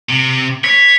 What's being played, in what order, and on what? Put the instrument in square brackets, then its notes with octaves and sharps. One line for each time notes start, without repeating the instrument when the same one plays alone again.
[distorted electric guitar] C3
[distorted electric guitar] C#5 [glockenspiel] B6